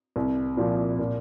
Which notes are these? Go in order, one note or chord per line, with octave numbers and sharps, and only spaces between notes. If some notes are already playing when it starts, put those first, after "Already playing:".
C2
A#2 F3
A#2